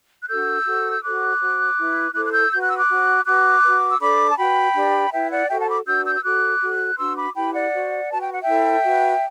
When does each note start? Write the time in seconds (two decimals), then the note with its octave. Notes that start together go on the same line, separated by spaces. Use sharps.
0.21 F#6
0.29 D4 F#4 A4 E6 G6
0.66 F#4 A4 C5
0.92 G6
1.03 F#4 A4 C5 D6 F#6
1.41 F#4 C5
1.78 E4 B4
2.14 E4 A4 C5 D6 F#6
2.26 F#6
2.33 E6 G6
2.52 F#4 B4 G6
2.61 F#6
2.69 E6
2.77 D6 F#6
2.90 F#4 C5
3.26 F#4 B4 D6 F#6
3.64 F#4 B4
3.91 E6
4.00 D4 A4 C5 B5 D6
4.30 A5
4.38 F#4 B4 G5 B5
4.75 D4 G4 B4
5.12 E4 B4 E5 G5
5.31 D5 F#5
5.49 F#4 A4 C5 E5 G5
5.59 F#5 A5
5.68 B5 D6
5.86 D4 F#4 B4 E6 G6
6.05 E6 G6
6.16 E6
6.24 F#4 A4 C5 D6 F#6
6.62 F#4 A4 C5
6.98 D4 F#4 B4 C6 E6
7.16 B5 D6
7.35 E4 G4 B4 G5 B5
7.54 D5 F#5
7.73 F#4 C5
8.10 F#4 B4 A5
8.21 G5
8.31 F#5
8.41 E5 G5
8.47 E4 A4 C5
8.84 F#4 B4